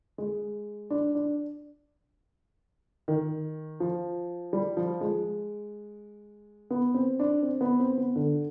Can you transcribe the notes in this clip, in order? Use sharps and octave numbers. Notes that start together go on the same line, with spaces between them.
G#3
D4
D4
D#3
F3
G3
F3
G#3
B3
C4
D4
C4
B3
C4
B3
D3